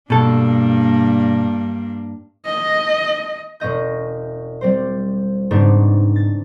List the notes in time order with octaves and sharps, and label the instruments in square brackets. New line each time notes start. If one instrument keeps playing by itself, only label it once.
[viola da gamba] G2 A#3 D4 [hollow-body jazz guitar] B2 A4
[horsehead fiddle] D#5
[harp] E1 C#4 D#5 G6
G3 C4 C5
G#2 C#3 B3 C4 D4 D#4
A6